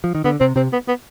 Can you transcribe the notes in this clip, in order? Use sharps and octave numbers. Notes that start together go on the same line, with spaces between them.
F3
D#3
D3 B3
C3 C4
C3 C4
B3
B3